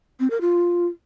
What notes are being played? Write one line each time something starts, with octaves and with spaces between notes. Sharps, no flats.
C4
A#4
F4